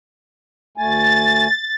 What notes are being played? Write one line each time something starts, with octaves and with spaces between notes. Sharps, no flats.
D2 A3 G#5 A6